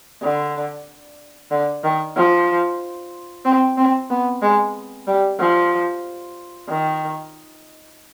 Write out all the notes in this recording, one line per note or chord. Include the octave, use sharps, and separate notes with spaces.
D3
D3
D#3
F3
C4
C4
B3
G#3
G3
F3
D#3